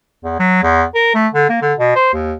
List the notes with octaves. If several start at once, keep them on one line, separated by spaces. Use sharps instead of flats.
E2
F#3
E2
A#4
A3
D3
A#3
D3
B2
C5
D#2